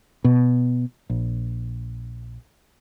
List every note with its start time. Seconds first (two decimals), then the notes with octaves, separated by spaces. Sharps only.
0.24 B2
1.10 A#1